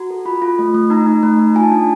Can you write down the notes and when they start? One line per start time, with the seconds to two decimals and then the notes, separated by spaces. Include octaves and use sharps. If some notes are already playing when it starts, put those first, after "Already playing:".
Already playing: F#4 A#5
0.10 A4
0.25 F4 B5
0.42 F4
0.59 A3
0.74 A3
0.90 D#4 A#5
1.06 D#4
1.23 A3
1.39 D#4
1.55 F4 G#5
1.63 A5
1.71 D4 G#5